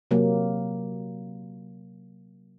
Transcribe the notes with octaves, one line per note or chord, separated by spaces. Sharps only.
C3 F#3 A#3